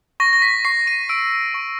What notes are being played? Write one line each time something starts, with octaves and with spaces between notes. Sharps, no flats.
C#6 A#6
A#6
B6
C#6 C7
D#7
E6 D7
C#6